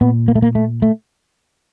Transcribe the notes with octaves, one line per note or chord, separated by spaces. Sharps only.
A#2 B3
A#3
A3
A#3
A3
A3